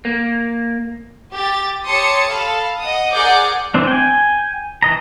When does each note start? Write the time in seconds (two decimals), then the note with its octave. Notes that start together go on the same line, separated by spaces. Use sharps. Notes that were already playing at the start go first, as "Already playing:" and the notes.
0.05 A#3
1.31 G4 A6
1.85 G4 C#5 A5 C6 D#6 C#7
2.28 A4 F5 A5 B5
2.80 D#5 F#5 D#6
3.12 G#4 A#4 D5 F#5 D6 G6
3.74 E3 C4 D4
3.87 G5 G#5
4.82 E3 D#5 A#5